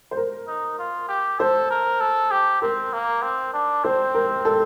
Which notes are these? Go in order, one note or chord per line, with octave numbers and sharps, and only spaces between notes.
C5
A#4
D#4
F4
G4
A4 C5
A#4
A4
G4
C4 A#4
A#3
C4
D4
C4 C5
A#4
A4